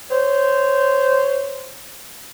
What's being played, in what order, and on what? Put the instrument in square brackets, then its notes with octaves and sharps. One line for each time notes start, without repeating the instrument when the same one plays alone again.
[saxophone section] C5 C#5